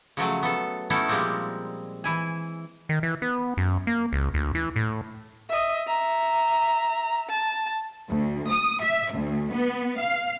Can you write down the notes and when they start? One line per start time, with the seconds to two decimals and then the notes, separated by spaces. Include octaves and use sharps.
0.17 C#3 F3 F#3 A3
0.42 B3 A4
0.90 A3 B3 C#4 D#4 E4 A4
1.09 A#2 F3 G3 G#3 A#3 C4
2.04 E3 E4 G#5
2.89 D#3
3.03 E3
3.22 B3
3.57 F#2
3.87 A#3
4.13 C#2
4.34 D2
4.55 E3
4.76 A2
5.49 D#5 E5
5.87 E5 A#5
7.29 A5
8.10 D2
8.49 D#6
8.82 E5
9.12 D2
9.52 B3
9.99 F5